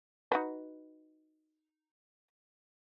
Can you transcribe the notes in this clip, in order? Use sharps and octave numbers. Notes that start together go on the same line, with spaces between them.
D#4 F#4 B4